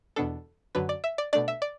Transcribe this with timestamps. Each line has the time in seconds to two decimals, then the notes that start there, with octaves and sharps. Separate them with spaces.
0.16 E2 B2 B3 D4 A4
0.75 F#2 D3 F#3 D4 B4
0.89 D5
1.04 E5
1.18 D5
1.33 B2 A3 D4 D5
1.48 E5
1.62 D5